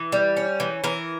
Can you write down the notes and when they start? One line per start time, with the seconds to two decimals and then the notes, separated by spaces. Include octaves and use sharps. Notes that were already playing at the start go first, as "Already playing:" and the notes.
Already playing: E3
0.12 G3
0.37 C#4
0.60 E3
0.84 E3 A#4